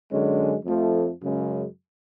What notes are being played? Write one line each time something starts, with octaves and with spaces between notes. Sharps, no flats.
F#2 D3 G#3 C#4
F2 F3 A3
F#2 C#3 G#3